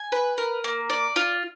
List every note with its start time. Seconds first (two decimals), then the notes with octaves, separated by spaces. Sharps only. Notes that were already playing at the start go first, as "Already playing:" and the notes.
Already playing: G#5
0.12 B4
0.38 A#4
0.64 A#3
0.90 D5
1.16 F4